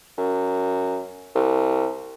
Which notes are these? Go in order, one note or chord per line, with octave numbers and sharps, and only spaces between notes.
F#2
C2